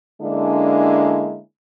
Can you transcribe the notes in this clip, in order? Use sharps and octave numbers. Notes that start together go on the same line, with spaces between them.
D3 G#3 A#3 C#4 D4 E4